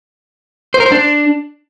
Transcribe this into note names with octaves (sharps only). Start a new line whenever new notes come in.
C5
A#4
C5
D4